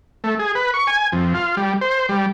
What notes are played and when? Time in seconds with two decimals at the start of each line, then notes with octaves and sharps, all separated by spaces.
0.24 A3
0.39 G#4
0.55 B4
0.74 C#6
0.87 G#5
1.12 F2
1.34 F4
1.57 G3
1.81 C5
2.09 G3